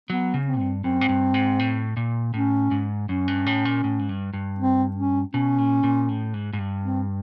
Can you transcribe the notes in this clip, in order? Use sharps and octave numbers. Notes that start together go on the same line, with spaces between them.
F#3 B3
C#3
C4
G2
F#2 C4
G#2
G2
G#2
A2
A#2
A2 C#4
G#2
F#2 C#4
G2
A2
A#2
A2
G#2
G2
G2
C4
C#4
B2 C#4
A#2
A#2
A2
G#2
G#2
G2
C4